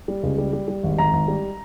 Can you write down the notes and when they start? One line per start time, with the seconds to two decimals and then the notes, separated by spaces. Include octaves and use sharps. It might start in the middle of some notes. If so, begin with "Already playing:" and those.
0.08 G3
0.23 C#2
0.38 G3
0.53 G3
0.68 G3
0.84 G#1
0.99 G#1 A#5
1.13 G#1
1.28 G3